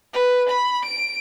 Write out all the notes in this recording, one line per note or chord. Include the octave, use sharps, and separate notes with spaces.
B4
B5
D7